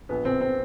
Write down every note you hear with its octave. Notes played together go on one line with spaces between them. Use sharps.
A#1 B3
A#1 C4
C4